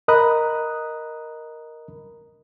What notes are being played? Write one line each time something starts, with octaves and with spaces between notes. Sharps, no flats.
A#4 D#5 A#5 B5 D#6 F#6